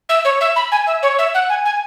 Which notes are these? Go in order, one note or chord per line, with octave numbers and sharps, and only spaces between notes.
E5
C#5
E5
B5
G#5
E5
C#5
E5
F#5
G#5
G#5